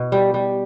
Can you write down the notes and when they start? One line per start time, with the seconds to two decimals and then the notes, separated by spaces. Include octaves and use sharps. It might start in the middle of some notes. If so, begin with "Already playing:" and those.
Already playing: B2
0.12 G3
0.34 G3